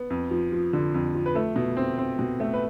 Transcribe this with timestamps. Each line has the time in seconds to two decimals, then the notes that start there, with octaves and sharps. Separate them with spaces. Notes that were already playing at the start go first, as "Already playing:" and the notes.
Already playing: B3
0.10 F2
0.31 F3
0.52 F3
0.73 D3
0.94 F2
1.14 F3
1.26 B4
1.35 A3 A4
1.56 B2
1.77 C4
1.98 C4
2.19 B2
2.40 A3
2.54 B4